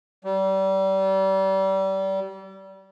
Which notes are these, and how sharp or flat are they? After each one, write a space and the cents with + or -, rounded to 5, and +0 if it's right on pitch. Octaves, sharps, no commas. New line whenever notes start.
G3 -30